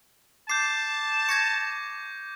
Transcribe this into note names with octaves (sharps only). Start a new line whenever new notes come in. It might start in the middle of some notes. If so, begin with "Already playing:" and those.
A5 D6 G6 C7
C#6 G#6 A#6 C#7